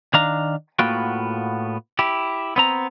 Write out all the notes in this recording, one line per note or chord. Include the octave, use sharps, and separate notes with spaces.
D#3 D4 F5 A#5
A2 A#3 B3 F4 F#4 G5
E4 G4
B3 C4 A#5